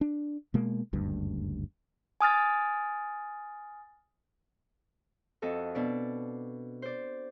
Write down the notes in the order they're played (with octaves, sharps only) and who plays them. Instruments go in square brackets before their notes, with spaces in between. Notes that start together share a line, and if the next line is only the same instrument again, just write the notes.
[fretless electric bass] D4
B2 G#3 A#3
F#1 D2 G2
[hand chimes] G#5 D#6 F6 A6
[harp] F2 F#4 A4 D#5
B2 D4 D5
C5 D5